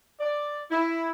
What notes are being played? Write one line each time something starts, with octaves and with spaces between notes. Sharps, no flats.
D5
E4